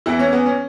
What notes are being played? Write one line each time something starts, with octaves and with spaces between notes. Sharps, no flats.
E2 E3 E4
C#4
B3
C#4